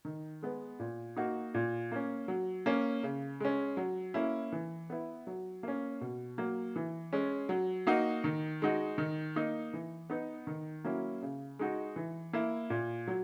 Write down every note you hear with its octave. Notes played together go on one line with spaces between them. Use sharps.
D#3
G#3 B3
A#2
A#3 D#4 F#4
A#2
A#3 C#4
F#3
A#3 C#4
C#3
G#3 C#4
F#3
A#3 C#4 E4
E3
B3 E4
F#3
A#3 C#4
B2
F#3 A#3
E3
G#3 C#4
F#3
A#3 D#4 F#4
D#3
G#3 D#4 F#4
D#3
A#3 D#4
E3
B3 D#4
D#3
F#3 A#3 C#4 E4
C#3
G#3 D#4 F#4
E3
A#3 E4
A#2
F#3